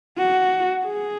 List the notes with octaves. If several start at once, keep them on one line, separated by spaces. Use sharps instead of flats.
F#4
G#4